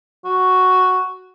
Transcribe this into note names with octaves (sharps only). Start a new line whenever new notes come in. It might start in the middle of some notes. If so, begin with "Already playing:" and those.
F#4